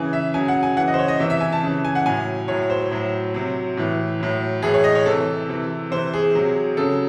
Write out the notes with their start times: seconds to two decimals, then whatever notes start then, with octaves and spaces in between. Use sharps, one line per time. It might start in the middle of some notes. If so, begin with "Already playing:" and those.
Already playing: C#3 E3 G#5
0.13 E5
0.34 C#3 F#3 G#5
0.48 F#5
0.63 G#5
0.77 C#3 E3 F#5
0.88 D#5
0.94 C5
0.99 C#5
1.08 D#5
1.19 C3 E3 E5
1.30 E5
1.41 G#5
1.52 A5
1.62 C#3
1.67 E3
1.85 G#5
1.95 F#5
2.06 A2 F#3 G#5
2.48 A2 F#3 C#5
2.70 C5
2.91 A2 F#3
3.34 C3 F#3
3.77 A2 E3
4.20 A2 F#3
4.62 A2 E3 G#4
4.74 C#5
4.84 D#5
4.95 C#5
5.06 C3 E3 A4
5.49 C3 E3
5.91 C3 E3 C5
6.14 G#4
6.35 C3 F#3
6.77 C#3 F#3 A4